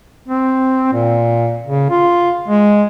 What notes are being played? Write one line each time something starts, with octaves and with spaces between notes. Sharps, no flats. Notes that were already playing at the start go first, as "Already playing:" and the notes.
C4
A#2
C#3
F4
G#3